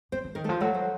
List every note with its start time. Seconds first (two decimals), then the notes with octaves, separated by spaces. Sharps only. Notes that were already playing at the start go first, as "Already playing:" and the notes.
0.12 F3 C4 C5
0.24 F3
0.35 D#3 A#4
0.44 A3 A4
0.49 F3
0.61 F#3 A3 A4
0.74 C5